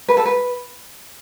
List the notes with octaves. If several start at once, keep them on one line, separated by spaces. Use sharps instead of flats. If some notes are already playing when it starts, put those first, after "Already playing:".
B4
A4
B4